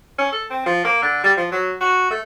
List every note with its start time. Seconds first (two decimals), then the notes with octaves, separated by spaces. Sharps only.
0.18 C#4
0.32 A4
0.50 C4
0.66 F3
0.85 A#3
1.02 D3
1.24 G3
1.37 F3
1.52 F#3
1.81 F#4
2.10 A3